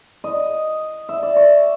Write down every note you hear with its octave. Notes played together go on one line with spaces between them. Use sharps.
D#5
E5
D5
C#5